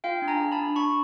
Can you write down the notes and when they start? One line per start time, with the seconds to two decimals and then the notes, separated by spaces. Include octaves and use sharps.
0.04 F4 F5 G5
0.22 D4
0.28 G#5 A#5
0.40 G#4
0.52 A5 B5
0.58 D4
0.76 D4 B5 C#6